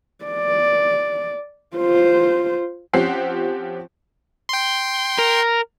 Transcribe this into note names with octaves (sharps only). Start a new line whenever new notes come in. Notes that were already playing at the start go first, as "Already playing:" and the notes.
D5
F4 C5
F3 C4 C#4 G4 F#5 C7
G5 C6
A#4